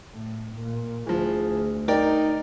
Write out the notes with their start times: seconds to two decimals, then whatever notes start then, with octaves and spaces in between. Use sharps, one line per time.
0.14 A2
0.56 A#2
1.07 D2 E3 F3 G#4
1.88 D#4 A#4 D5 G5